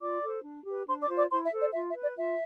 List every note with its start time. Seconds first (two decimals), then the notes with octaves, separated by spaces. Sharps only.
0.01 F4 D5 D6
0.23 A4 C5
0.44 D4
0.66 G4 B4
0.87 D4 C5 C6
1.02 D5 D6
1.09 F4 C5
1.17 D5 D6
1.30 E4 C5 C6
1.44 E5
1.52 A4 C5
1.60 D5
1.73 F4 E5
1.89 E5
1.95 B4
2.02 D5
2.17 F4 E5